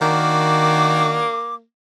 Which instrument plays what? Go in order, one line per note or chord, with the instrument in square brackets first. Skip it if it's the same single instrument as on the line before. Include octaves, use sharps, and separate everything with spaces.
[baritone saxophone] D#3 [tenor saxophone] A#3 [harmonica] D4 F#4 [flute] D6